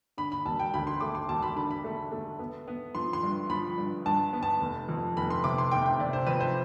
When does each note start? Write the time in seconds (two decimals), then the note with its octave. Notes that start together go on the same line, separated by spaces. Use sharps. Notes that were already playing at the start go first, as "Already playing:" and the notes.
0.17 D3 B5
0.32 B5
0.45 E1 A5
0.59 G5
0.74 D2 B5
0.87 C6
1.01 A3 D6
1.15 C6
1.29 E1 A5
1.42 B5
1.56 D3 B5
1.71 B5
1.84 A3
2.12 A3
2.39 B3
2.68 B3
2.95 F3 C6
3.13 C6
3.23 G2
3.50 F3 B5
3.78 G2
4.06 G2 A5
4.33 B3
4.43 A5
4.61 F1
4.89 F2
5.17 F1 B5
5.30 C6
5.44 C3 D6
5.58 C6
5.71 F1 G5
5.86 G5
5.99 C3 D5
6.13 C5
6.26 F2 B4
6.40 C5